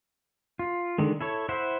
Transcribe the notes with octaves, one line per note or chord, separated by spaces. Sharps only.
F4
D3 D#3 G#3
E4 A4 C#5
E4 C5 E5 F#5